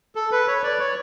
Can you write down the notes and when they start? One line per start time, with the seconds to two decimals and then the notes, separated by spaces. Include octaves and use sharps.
0.15 A4
0.32 B4
0.48 C#5
0.64 D5
0.80 C#5